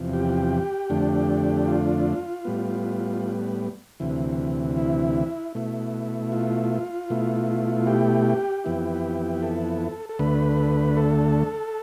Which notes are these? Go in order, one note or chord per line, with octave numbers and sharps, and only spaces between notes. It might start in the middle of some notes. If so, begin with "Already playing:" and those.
Already playing: E2 C3 F3
G4
F2 D3 A3 D4
F4
A2 G3 B3
D2 C3 E3
E4
B2 A3 E4
F4
B2 A3 E4
G4
F2 E3 B3 E4
A4
A4
D2 D3 A3 B4
A4